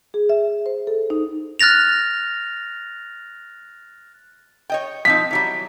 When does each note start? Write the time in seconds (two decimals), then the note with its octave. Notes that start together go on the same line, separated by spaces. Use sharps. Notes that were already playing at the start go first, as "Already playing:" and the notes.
0.14 G#4
0.29 E5
0.66 C5
0.87 A4
1.10 D#4
1.59 F6 F#6 A6 A#6 F7
4.70 C#5 D#5 G5
5.05 F3 C4 D#4 B6
5.31 E3 F#3 G3